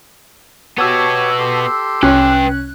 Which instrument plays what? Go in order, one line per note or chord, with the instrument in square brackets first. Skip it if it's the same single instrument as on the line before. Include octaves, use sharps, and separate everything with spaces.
[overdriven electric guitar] B3 F#4 [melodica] G4 C#5 [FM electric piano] A5 E6
[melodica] G4 A4 C6
[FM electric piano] C2 F#6 [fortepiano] C#4 [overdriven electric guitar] B4 G5